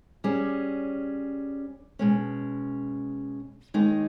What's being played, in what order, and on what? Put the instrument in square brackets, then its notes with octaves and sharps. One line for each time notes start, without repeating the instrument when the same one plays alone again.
[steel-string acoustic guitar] G3 C#4 G#4
B2 G#3 C#4
D#2 D#3 G#3 D#4